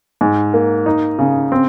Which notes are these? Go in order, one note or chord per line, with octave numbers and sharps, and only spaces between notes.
G#2
A#3
D#4
C#3
C4